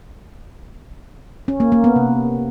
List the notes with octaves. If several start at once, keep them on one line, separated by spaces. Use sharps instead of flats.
C#4
A#3
A#3
B3
C3